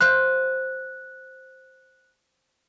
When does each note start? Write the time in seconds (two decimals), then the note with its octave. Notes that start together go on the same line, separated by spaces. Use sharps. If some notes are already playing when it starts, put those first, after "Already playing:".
0.01 C5 F5 C6 F#6